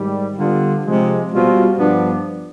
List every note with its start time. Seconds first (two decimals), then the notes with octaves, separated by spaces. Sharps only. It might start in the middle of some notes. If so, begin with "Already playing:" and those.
Already playing: G#2 D#3 G3
0.36 D3 G3 B3 F4
0.83 C3 F3 G#3
1.30 B2 G3 C4 F4
1.77 G2 F3 B3 D4